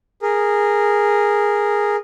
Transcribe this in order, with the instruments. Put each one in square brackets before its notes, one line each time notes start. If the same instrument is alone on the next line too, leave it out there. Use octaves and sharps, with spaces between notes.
[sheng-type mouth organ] G#4 A#4